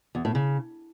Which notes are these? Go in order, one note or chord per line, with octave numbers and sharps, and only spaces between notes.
E2
A2
C#3